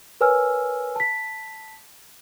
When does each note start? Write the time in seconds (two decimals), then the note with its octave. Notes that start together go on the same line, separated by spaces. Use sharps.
0.21 A#4 B4 C#5 G#5 E6 F6
0.96 A5 B6